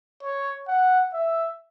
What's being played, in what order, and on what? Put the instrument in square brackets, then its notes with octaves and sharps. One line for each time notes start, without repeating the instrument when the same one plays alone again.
[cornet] C#5
F#5
E5